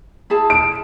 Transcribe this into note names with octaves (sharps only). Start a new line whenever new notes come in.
E4 G#4 A5
D7